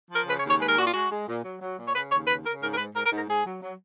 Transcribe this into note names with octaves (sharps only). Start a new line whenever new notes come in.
F3 A#4
C#3 B4
C#5
D#2
C#5
G#3 B4
A#4
A#2 F#4
F4
G#3 F#4
G#3
A#2
F#3
F#3
A#2
C#5
C#3 B4
D#2 C#5
C#3 B4
C#3 A#4
G#2 A#4
A#4
G#2 B4
G#2 A#4
A#4
G#2
A#4
G#2 G#4
F#3
F#3